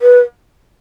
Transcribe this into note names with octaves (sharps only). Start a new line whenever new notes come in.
B4